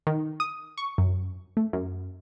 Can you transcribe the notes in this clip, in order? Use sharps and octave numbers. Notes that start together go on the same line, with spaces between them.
D#3
D#6
C#6
F#2
A3
F#2